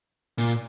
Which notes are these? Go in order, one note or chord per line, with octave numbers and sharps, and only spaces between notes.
A#2